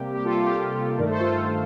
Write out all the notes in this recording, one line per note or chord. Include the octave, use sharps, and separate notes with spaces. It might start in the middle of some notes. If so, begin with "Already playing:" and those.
Already playing: C3 G3 A#3 G4
G4
F4 A4
F4
G4
G2 D#3 A3 A#4 D5
A4 C5
F4 A4
F4